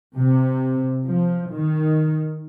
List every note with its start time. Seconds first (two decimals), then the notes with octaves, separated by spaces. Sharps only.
0.18 C3
1.05 F3
1.53 D#3